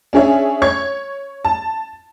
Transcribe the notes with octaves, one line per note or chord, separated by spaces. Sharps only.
C#4 D4 G#4 C#5 E5
C#5 C#6 G#6
A5